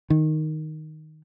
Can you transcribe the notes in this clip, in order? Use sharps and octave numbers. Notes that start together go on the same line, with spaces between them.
D#3